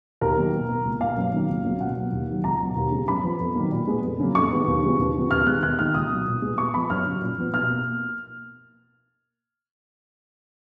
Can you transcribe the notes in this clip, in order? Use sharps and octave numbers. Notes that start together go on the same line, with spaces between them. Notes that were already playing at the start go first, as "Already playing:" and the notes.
D#2 A#4
D#3 F#3 A#3
B2
A#3
C#2
B2 A#3 F5
F#2
D#3 F#3 A#3
C#2
C#3 F#3 A#3
B2 F#5
F#3 A#3
D#2
D#3 F#3
C#2 A#5
B2 F#3
D#2
C#3 G#3 B3
F#2 B5
F3 B3
F2
D#3 F#3 A#3
A#2
G#3 B3
F2
C#3 F#3 A#3
F2 C#6
D#3 G#3 B3
D#2
C#3 F3 G#3 B3
D#2
C#3 F3 B3
D#2 F6
D#3 G#3 B3 F#6
D#2 F#6
D#3 A#3 F6
C#2 D#6
B2 F#3
A#2
G#3 B3
A#2 C#6
F3 B3 B5
F#2 F6
C#3 F#3
A#2
F3 B3
B2 F6
A#3